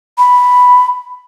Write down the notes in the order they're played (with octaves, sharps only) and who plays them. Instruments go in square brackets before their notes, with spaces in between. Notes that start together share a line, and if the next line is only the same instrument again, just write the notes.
[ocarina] B5